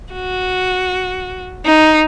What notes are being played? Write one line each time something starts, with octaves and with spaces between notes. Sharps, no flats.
F#4
D#4